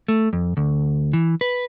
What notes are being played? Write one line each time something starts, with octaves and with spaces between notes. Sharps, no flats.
A3
F2
D2
E3
B4